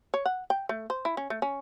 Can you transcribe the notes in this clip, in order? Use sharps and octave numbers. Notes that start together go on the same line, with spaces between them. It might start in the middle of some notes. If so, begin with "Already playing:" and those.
C#5
F#5
G5
A3
C5
E4
C#4
A3
C#4